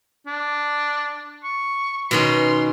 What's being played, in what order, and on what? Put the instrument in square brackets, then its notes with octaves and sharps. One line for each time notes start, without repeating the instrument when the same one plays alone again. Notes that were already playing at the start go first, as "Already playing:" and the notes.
[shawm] D4
C#6
[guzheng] B2 D#3 C#4 [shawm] C6